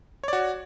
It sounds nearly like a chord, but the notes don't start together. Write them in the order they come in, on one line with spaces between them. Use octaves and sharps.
C#5 D5 F#4